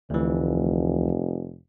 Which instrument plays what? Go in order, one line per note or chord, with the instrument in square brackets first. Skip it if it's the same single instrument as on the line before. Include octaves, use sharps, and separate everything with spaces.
[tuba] F1 [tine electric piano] D2 E3